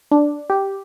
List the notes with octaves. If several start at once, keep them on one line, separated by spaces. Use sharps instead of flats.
D4
G4